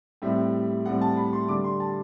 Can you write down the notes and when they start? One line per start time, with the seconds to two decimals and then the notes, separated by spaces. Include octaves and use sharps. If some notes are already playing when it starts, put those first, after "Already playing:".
0.22 A2 G3 C4 E5
0.85 A2 G3 C4 F#5
1.01 A5
1.17 B5
1.33 C6
1.48 D3 G3 D4 D6
1.64 C6
1.80 A5